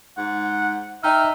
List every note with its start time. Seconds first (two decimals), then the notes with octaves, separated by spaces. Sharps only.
0.17 G#2 F#5
1.03 D#4 D#5 E5 G5 F6